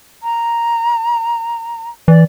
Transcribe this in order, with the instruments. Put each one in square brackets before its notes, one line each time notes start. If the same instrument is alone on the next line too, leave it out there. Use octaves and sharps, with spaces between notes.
[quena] A#5
[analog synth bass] E3 [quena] D5